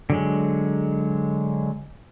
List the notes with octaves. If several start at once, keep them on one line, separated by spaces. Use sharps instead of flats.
D3 F#3 G#3